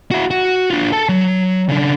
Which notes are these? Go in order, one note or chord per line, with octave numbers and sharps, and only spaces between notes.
E4 F#4
F#4
D4 F4
A4 A5
F#3
C#3 D4